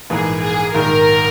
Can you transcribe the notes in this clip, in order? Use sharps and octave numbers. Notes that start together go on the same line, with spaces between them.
A#1 G#2 E3 A#3 G#4
G#4
A#1 G#2 D#3 A#4